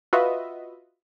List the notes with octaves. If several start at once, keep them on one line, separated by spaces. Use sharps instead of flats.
F4 F#4 B4 D#5 E5